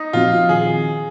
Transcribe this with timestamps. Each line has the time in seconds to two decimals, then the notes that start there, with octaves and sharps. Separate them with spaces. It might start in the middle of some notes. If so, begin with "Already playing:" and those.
Already playing: D#4
0.13 A#2 F3 C4 F4 F#4
0.49 D#3 G#4